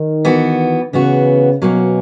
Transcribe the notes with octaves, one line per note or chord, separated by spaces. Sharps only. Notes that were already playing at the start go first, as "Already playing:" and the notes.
Already playing: D#3
E3 B3 F#4
C#3 E3 B3 F#4
B2 F#3 A#3 C#4